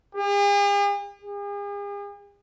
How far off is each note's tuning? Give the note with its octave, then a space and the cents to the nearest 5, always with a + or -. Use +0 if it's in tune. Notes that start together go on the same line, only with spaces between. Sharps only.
G#4 -45
G#4 -45